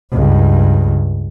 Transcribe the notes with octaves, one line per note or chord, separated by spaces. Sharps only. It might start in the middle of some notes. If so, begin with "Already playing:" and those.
C#2 G2